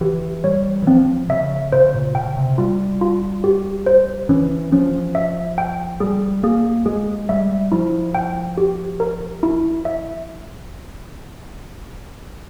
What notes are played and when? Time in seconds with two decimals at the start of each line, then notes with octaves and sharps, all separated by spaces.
0.01 E3 G4
0.44 G3 C#5
0.82 E3
0.87 F3 C4
1.29 C#3 E5
1.72 C#3 C5
1.94 A#2
2.15 C#3 G5
2.37 C3
2.58 G3 F4
3.01 F4
3.44 G4
3.86 C5
4.29 E3 C#4
4.72 F3 C#4
5.15 E5
5.58 G5
6.00 G3 G#4
6.43 A#3 G#4
6.86 G#3 G#4
7.29 G3 E5
7.72 F3 E4
8.15 G5
8.58 G4
9.00 A#4
9.43 E4
9.85 E5